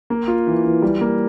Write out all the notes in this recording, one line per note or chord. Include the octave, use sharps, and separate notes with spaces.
A#3
F4
E3
E3
G3
A#3